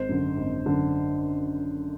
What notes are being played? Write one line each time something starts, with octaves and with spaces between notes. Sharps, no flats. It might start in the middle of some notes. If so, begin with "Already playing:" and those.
Already playing: G#1 C5
F#2 D3
G#1
F#2 D3